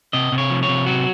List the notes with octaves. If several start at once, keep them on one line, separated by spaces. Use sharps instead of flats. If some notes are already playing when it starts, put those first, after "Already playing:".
C3 D#5
C3
C#5
F3
C#5
C3
F#3 F#4